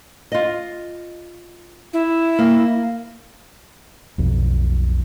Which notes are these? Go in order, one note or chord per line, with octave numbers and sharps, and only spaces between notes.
F4 D#5
E4
A#3
B1 F2